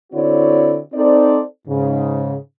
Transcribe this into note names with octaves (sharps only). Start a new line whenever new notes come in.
D3 C4 E4 F#4 C#5 D5
C4 D#4 A4 C5 D5
G#2 C#3